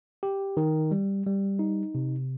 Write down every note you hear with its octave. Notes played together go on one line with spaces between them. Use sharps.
G4
D#3
G3
G3
D#4
C3